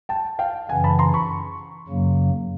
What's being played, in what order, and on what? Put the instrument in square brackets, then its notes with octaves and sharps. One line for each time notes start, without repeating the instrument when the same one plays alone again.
[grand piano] G5 A5
F5 G5
[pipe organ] F#2 C#3 E3 [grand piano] F#5 G#5
[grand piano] A5 B5
A#5 C6
B5 C#6
[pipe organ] F#2 C#3 F#3 A#3